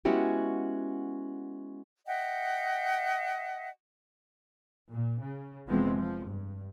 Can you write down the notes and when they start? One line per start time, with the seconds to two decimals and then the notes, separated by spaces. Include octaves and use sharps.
0.05 G#3 B3 C#4 E4 F#4 G4
2.06 D#5 E5 F#5 G5
4.90 A#2
5.21 C#3
5.67 F1 E3 F3 G#3 B3 C4
5.97 F3
6.27 G2